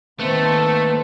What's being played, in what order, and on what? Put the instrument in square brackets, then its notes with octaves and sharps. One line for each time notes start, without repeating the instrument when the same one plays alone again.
[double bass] D#3 C4 [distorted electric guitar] A3 [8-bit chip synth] A#3 B4